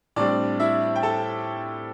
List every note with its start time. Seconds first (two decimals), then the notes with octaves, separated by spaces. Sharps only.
0.16 A2 G3 C4 D4 D5
0.60 E4 E5
0.96 G5
1.03 A4 A5